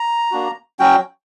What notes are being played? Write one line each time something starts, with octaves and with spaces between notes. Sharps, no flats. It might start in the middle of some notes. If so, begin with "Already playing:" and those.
Already playing: A#5
A#3 D4 F#4
F#3 C#4 F#4 G5